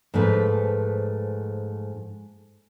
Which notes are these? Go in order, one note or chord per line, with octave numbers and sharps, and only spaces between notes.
G#2 F3 A3 B4